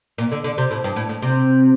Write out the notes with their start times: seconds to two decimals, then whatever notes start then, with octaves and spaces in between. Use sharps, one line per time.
0.18 A#2
0.32 D3
0.44 D3
0.58 C3
0.71 A2
0.84 G2
0.96 A2
1.09 A2
1.22 C3